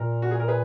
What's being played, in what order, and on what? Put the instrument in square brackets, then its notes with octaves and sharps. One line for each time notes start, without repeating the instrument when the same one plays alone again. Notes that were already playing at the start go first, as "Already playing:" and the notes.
Already playing: [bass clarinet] A#2 [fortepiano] A#4
[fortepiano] F#4
G#4
A#4
G#4 B4